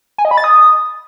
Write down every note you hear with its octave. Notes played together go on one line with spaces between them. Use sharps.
G#5
D#5
B5
A6
D#6